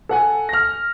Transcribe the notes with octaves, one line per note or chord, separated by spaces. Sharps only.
A4 F#5 G#5
F6 A#6